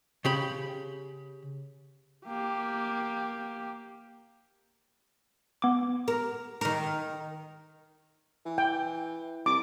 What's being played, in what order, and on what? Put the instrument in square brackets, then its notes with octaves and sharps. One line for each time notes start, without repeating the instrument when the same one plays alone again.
[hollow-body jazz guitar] C#3 G4 B5
[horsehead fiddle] A#3 G4
[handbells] B3 D6
[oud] A#4
D#3 A#4
[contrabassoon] E3
[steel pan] G5
[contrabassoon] C2 [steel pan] D6